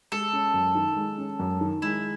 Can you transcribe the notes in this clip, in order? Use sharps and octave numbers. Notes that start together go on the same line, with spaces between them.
G#3 A4
C#4
F#2
D#3
G#3
C#4
F#2
D#3
G#3 E4